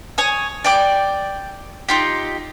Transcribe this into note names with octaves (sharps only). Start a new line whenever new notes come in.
C#5 G#5 D#6
D5 G5 D6
D#4 F4 G4